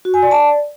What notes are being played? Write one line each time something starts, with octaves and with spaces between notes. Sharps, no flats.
F#4
G#5
D5
A5
D5